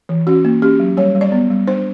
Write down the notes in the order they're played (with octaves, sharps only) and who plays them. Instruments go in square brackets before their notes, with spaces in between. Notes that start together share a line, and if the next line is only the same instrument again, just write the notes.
[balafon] E3
C#4 F#4
A#3
C#4 G4
F#3
G3 C#5
G3
D5
B3
G3
D4 C5